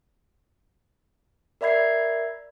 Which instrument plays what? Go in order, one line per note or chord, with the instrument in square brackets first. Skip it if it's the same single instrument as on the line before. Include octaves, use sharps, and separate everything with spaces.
[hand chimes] A#4 D5 E5 B5 G#6 C7